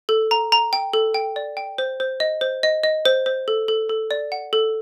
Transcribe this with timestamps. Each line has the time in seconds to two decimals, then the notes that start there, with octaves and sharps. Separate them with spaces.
0.09 A4
0.31 A#5
0.52 A#5
0.73 G5
0.93 A4
1.14 G5
1.36 D5
1.57 G5
1.78 C5
2.00 C5
2.20 D#5
2.41 C5
2.63 D#5
2.84 D#5
3.05 C5
3.26 C5
3.48 A4
3.68 A4
3.89 A4
4.11 D5
4.32 F#5
4.53 A4